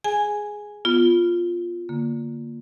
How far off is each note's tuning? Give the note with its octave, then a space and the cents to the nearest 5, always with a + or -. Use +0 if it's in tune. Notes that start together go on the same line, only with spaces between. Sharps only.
G#4 +0 G#5 +0
B3 +0 F4 +0
D3 -15 A#3 +0